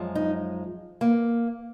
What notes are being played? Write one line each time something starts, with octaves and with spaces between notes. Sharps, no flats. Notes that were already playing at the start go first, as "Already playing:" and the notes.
Already playing: F#2 F3 G#3
D#4
A#3